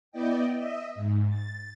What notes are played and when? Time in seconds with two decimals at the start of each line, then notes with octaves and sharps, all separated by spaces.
0.12 B3 E4 D5 D#5 G5
0.55 D#5 E5
0.95 G#2
1.29 A6